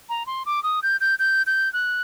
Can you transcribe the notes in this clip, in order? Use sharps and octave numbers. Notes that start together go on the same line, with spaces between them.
A#5
C6
D6
D#6
G6
G6
G6
G6
F#6